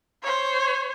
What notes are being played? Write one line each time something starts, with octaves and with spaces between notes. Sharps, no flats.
C5 C#5